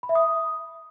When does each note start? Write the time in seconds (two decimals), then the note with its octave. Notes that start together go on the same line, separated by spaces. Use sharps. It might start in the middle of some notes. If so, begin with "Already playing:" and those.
0.03 B5
0.09 E5
0.15 D#6